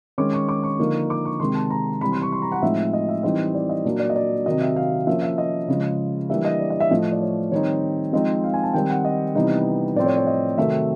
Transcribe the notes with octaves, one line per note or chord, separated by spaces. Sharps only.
D#3 G#3 C#4 D6
C#6
D6
C#6
D3 F3 A#3 D#4
D6
C#6
C3 D#3 G#3 C6
A5
A#5
C3 E3 G3 B5
C6
C#6
C6
A#5
F#5
A2 F3 G#3 C4 D#4 E5
D#5
E5
E3 G3 C4 D#4 D#5
D5
D#5
A#2 F#3 A#3 D4
D5
D#5
D5
C3 D#3 F#3 D#5
E5
F5
F3 A#3 C#4 E5
E5
D#5
C#3 F3 G#3
E3 G3 A#3 D4 E5
D#5
D5
D#5
E5
A2 F3 A3 D#5
D5
C#5
D#3 G3 C4 D#4 C#5
F3 G#3 C4 D#4 D#5
F5
G#5
A5
D#3 G3 C4 G5
F#5
D#5
C3 E3 G3 B3 D#4 D#5
A2 F3 A3 C4 D5
C#5
C#5
D#5
C3 D#3 F#3 A3 C4 E5